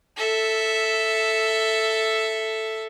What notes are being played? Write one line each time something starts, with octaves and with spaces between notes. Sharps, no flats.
A4 E5